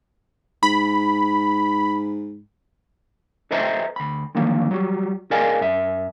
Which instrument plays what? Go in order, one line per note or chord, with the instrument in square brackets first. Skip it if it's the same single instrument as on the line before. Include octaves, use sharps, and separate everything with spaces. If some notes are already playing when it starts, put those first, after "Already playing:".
[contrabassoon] G#2 [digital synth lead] B5
[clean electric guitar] A4 B4 C5 D#5 E5 A#5
D2 B5
D3 D#3 F3 F#3 A#3
F#3 G3 F#4
G#4 A#4 D5 D#5 F5 G#5
F#2 E5